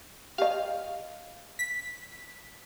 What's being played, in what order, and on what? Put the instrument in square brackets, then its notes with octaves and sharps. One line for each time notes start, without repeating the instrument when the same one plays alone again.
[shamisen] G4 D#5 [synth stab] F5
[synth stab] B6